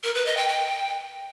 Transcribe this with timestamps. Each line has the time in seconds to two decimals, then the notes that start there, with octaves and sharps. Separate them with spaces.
0.04 A#4
0.15 B4
0.26 D#5
0.37 G5
0.48 G5